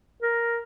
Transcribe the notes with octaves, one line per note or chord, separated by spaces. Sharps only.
A#4